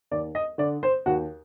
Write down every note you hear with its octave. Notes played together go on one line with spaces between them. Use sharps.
D#2 D5
D#5
D3 D5
C5
D#2 F#4